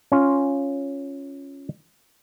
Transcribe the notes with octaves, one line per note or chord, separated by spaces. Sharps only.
C#4 F4